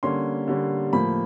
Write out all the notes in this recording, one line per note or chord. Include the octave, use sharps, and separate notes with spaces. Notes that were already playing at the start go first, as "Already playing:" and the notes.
D3 G3 A#3 C#4 C6
D3 G3 A#3 C#4
A2 F3 A#3 B5